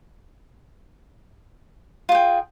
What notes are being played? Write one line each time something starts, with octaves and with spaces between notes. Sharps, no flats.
F4 G#4 G5